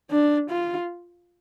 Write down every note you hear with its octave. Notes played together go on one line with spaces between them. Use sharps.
D4
F4